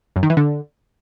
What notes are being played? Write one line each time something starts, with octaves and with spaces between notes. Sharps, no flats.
F#2
D#3
E3
D3